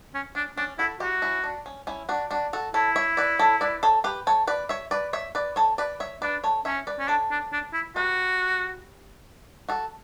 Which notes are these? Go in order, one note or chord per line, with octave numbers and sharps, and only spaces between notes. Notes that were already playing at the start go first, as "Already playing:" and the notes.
C#4
C#4 D4
C#4 D4
E4 F#4 A4
E4 F#4 G4
C#4 E4
D4
C#4
C#4 E4
D4 F#4
D4 F#4
F#4 A4
E4 A4 C#5
C#5 E5
B4 D5
A4 C#5
B4 D5
A4 C#5
G4 B4
A4 C#5
B4 D5
C#5 E5
B4 D5
C#5 E5
B4 D5
A4 C#5
B4 D5
C#5 E5
D4 B4 D5
A4 C#5
C#4 C#5 E5
B4 D5
C#4
D4 A4 C#5
D4
D4
E4
F#4 G4 B4
F#4 A4